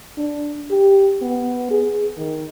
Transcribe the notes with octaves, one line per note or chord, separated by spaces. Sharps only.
D4
G4
B3
G#4
D#3